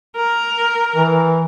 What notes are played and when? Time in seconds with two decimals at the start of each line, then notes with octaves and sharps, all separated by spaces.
0.16 A#4
0.96 E3